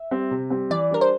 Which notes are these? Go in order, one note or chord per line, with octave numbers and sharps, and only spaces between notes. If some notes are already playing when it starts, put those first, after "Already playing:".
Already playing: E5
G3 C4
C3
G3 C4
E3 D5
G3 D4 A#4
C5